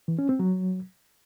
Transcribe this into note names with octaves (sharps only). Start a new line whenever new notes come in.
E3
C#4
C4
F#3